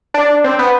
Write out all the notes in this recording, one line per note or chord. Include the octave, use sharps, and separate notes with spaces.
D4
C4
B3